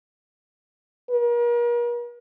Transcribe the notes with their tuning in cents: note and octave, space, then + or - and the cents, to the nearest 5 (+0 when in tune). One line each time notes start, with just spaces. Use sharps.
A#4 +40